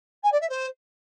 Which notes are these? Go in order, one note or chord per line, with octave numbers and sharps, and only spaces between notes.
G#5
D5
E5
C5